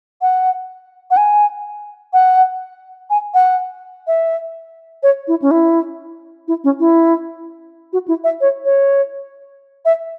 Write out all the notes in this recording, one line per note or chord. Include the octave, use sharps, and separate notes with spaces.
F#5
F#5
G#5
F#5
G#5
F#5
E5
C#5
E4
C#4
E4
E4
C#4
E4
F#4
E4
E5
C#5
C#5
E5